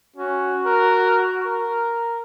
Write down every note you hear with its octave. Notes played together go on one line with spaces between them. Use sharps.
C#4 F#4
A#4
A#4